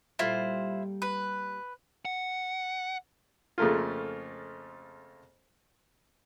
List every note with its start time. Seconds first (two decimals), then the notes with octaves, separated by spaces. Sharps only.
0.19 A#2 G3 E4 F4 A4 C5
1.02 B4
2.05 F#5
3.58 F2 C#3 A3 A#3 F4